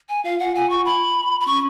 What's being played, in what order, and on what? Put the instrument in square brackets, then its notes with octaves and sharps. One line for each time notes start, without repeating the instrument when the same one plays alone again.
[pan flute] G#5
[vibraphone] F4 [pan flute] F5
[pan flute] F#5
[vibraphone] F4 [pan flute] G#5
[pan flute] C#6
B5
B5
[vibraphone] C#4 [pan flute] C#6